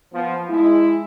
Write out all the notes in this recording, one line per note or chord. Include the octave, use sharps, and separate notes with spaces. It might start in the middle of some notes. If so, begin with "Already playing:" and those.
F3 B3
G#3 E4